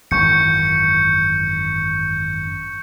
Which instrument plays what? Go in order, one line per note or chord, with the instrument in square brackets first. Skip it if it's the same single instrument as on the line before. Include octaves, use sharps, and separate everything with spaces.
[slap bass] G#1 F#2 E3 [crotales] C#6 G6 C#7